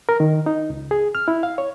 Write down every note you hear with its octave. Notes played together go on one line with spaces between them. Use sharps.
A#4
D#3
D#4
C#2
G#4
F6
E4
F5
C#5